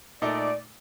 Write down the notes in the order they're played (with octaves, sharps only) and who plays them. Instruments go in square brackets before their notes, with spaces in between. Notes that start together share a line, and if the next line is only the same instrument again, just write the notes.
[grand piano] A#2 A3 D#4 A4 [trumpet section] D5